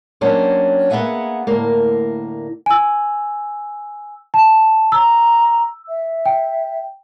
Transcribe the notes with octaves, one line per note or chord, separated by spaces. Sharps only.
F#3 A#3 C#4 D4 G4 C5
A#3 B3 G#4 E5 F#5 G#5
D2 A2 A#3 A#4
G#5 E6
A5
A#5 E6
E5
G5